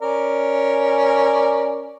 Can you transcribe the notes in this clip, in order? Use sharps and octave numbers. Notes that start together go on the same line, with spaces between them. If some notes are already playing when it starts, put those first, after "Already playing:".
C#4 A#4 D5